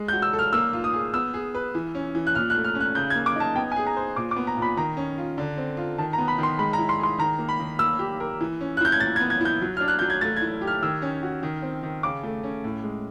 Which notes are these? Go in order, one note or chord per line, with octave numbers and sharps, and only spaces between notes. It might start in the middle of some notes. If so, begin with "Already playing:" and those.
Already playing: G#3
G6
F#4
E6
A4
F6
A#3 E6
F4
D#6
G#4
B3 E6
G#4
B4
E3
C#4
E3
F#6
A#2 F6
F#6
A3
F6
C#4
F#6
C#3 G6
G#6
A#3
D6
D#4 A5
B3 G5
G#5
G#4
A#5
C5
A#2 D6
D6
B3
A#5
A#2
B5
D#3 A#5
C#4
F4
D3
C4
F4
D#3 A5
A#5
B3
B5
D#3
C6
G#3 B5
A#5
E4
C6
G#4 C6
D#3 A#5
A#3
B5
D#3
A#3 E6
G4
A#4
E3
C#4
F#6
E4 G6
G#6
A#2 A6
G#6
B3
G#6
E4 G6
F#3
D4 F6
F#6
F#3 G6
G#6
A3 A6
G#6
E4
G4
F6
D#3 E6
C#4
F#4
D#3
C4
D#3
C#3 D6
A3
C#4
A2
G#3